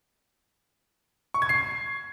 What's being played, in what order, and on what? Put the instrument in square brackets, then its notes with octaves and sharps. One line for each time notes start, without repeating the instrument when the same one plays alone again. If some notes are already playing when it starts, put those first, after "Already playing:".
[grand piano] C#6
G#6
C7